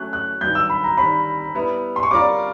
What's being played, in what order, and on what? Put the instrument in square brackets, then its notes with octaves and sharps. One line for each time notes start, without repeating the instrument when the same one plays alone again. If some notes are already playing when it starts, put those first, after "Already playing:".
Already playing: [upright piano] F#3 A3 C#4 [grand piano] F#6
[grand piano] F#6
[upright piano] G2 D#3 F#3 [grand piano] G6
[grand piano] E6
B5
A#5
[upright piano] D#3 G3 C4 [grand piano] B5
[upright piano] G3 B3 E4
[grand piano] C6
C#6
[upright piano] G3 C4 F4 A#4 D5 [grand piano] D6